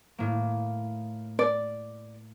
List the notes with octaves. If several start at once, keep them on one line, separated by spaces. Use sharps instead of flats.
A2 A#3
D5